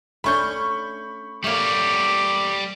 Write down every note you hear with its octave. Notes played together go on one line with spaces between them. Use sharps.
A3 C#4 D4 B5 C#6 G6
G3 A3 A#3 C#5 D6